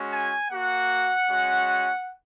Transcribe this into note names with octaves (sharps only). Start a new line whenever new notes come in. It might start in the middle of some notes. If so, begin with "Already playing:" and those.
Already playing: G#3 C#4 F#4
G#5
A#3 F#4 F#5
G#3 C#4 F#4